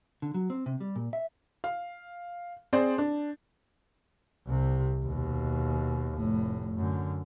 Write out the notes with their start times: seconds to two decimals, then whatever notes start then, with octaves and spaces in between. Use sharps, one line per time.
0.22 D3
0.34 F#3
0.50 C4
0.66 C3
0.81 G3
0.96 A#2
1.13 E5
1.64 F5
2.73 C4 G#4 C5 D5
2.98 D4
4.47 C2 C3
5.04 D#2 B2
6.14 F1 A2
6.76 F#2 D3